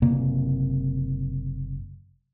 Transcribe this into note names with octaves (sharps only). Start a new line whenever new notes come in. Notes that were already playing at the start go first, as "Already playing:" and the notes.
F#1 C3 A#3